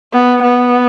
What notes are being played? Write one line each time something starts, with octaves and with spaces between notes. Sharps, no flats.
B3
B3